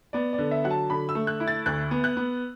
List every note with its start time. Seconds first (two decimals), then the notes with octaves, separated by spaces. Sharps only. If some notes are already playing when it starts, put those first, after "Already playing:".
0.13 B3 D5
0.33 D5
0.38 D3
0.51 E5
0.64 F#3 F#5
0.71 A5
0.90 D3 B5
1.09 E6
1.15 A3
1.27 F#6
1.40 E4
1.48 A6
1.66 D2 F#6
1.91 B3
2.04 F#6
2.17 B3